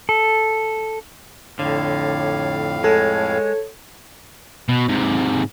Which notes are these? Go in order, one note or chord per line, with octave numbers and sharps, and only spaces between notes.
A4
F2 A2 D3 C#5 F5
G#3 A4 C#5
B2
G#2 C3